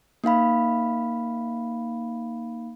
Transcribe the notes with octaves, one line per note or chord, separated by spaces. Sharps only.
A#3 D#4 F5 B5